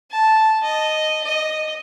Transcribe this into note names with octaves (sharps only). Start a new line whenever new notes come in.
A5
D#5
D#5